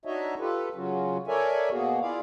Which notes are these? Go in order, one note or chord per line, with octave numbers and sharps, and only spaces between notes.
D4 D#4 F#4 C#5 D#5 E5
F4 G4 A4 B4
C#3 F#3 C#4 F4 F#4
A4 A#4 C#5 D5 E5 G#5
B2 A#3 B3 F#4 G#4
E4 F4 G#4 D5 F5